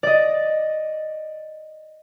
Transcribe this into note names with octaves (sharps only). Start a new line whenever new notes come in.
D5 D#5